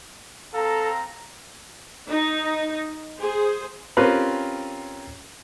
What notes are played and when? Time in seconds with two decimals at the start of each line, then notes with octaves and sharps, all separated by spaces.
0.54 C4 A4 F5 A#5
2.08 D#4
3.19 G#4 C5
3.97 C4 C#4 F4 G4 A#4 B4